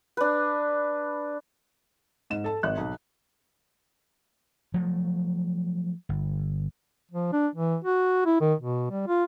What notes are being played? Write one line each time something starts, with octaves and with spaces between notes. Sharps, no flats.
D4 B4
G#2 E7
A4 A5
G#1 F#6
B1
F3 F#3 A3
G1
F3
D4
E3
F#4
E4
D#3
B2
G3
F4